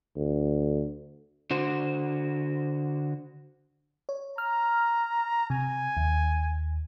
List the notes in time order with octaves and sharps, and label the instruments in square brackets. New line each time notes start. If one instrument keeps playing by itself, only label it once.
[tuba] D2
[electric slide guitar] D3 F#4 C5
[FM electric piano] C#5
[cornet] A#5 [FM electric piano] F6
[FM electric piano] C3 [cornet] G#5
[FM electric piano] D#2